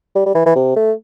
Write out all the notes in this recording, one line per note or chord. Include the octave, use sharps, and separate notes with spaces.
G3
G3
E3
E3
C3
A3